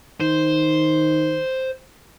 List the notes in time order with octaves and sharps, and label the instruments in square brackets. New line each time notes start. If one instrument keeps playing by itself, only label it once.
[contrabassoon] D#3 [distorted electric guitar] C5